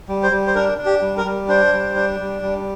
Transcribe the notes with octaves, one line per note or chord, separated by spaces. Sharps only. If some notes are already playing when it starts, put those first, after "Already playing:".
G3
C5
G3
C5
D4 A#4
D4
G4
G3
A#4
G3
D4 C5
G3
D4
G3
G3